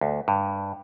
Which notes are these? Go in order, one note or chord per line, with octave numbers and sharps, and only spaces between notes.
D2
G2